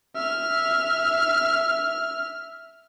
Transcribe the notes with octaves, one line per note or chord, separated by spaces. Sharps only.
E5 F6